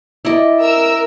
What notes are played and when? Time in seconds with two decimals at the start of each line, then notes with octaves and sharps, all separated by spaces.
0.25 E4 D5 D#5
0.61 A#4 E6